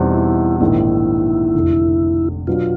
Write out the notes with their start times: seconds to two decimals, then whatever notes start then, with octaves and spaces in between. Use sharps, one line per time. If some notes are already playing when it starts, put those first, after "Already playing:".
Already playing: E2 B2 G3 C4 D#4
0.14 E4
0.61 A#1 G#2 D#3 E4
1.55 F1 F2 D3
2.47 B2 F#3 B3 D4 F4 F#4